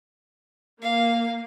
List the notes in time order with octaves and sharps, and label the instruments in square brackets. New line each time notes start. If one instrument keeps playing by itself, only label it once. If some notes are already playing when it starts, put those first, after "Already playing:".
[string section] A#3 [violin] F5